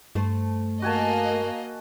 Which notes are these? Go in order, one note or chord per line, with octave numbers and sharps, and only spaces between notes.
G2 A3 C5
A#3 F#4 D#5 G#5 A5